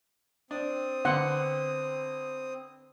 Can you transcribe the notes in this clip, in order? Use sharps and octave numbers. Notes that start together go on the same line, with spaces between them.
C4 D4 D#6
D3 B3 F#5 C6